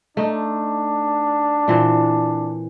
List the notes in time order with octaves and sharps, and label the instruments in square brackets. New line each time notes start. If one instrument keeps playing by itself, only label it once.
[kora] A3 D#4 [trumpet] D4
[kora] A#2 E3 C4